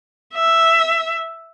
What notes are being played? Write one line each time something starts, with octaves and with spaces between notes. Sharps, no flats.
E5